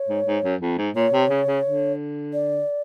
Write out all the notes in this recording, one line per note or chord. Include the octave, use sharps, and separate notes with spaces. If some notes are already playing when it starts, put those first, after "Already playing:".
Already playing: C#5
G#2
G#2
F#2
F2
G#2
A#2 C#5
C3
C#3
C#3
D3
D5